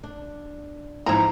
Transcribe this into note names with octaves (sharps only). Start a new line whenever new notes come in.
D4
G#2 E3 F3 E4 A#5